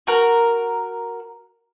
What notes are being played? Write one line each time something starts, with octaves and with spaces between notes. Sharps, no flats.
F#4 A#4